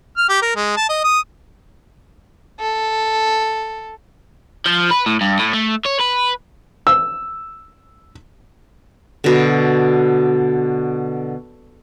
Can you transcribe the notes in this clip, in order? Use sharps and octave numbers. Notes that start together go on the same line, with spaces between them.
F6
G4
A#4
G#3
A5
D#5
D#6
A4
F3
B4
A2
G2
A2
A3
C#5
B4
E6
B2 D3